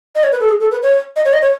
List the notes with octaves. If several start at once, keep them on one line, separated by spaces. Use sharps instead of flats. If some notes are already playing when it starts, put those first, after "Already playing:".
D#5
C#5
B4
A4
G#4
A4
B4
C#5
D#5
C#5
D#5
C#5